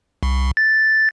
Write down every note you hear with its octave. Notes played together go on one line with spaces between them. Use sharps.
C2
A6